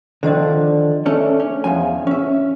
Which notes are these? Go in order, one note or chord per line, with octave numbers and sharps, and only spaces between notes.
D3 D#3 F3 D4
A3 C#4 D4 A4
C#4
E2 G2 F3 G#5
C#4 E5